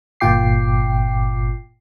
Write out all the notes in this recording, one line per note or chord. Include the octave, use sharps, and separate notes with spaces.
G1 A#2 F4 G5 D6 C7